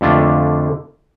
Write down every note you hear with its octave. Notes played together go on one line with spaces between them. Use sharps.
F2 D3 A3 D4 F4